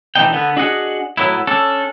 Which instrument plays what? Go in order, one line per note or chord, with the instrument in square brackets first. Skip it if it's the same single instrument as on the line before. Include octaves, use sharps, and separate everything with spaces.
[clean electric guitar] B1 E3 C4 D4 D#4 G5
D3 B3
D4 F#4 G#4 D#5 F#5
A2 F#3 B3 E4
C#4 D4 A4